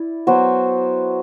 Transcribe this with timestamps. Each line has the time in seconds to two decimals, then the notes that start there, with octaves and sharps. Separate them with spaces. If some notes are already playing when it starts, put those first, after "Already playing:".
Already playing: E4 D5
0.27 F#3 B3 F#4 C5